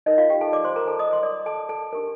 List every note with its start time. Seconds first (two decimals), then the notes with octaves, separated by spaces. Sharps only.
0.06 D#4 A#4 D#5
0.18 F4 F5
0.30 G4 G5
0.41 A4 A5
0.53 D5 D6
0.64 C5 C6
0.76 A#4 A#5
0.87 A4 A5
0.99 D#5 D#6
1.13 C6
1.23 D5 D6
1.46 A4 A5
1.69 A4 A5
1.93 D4 G4 A#4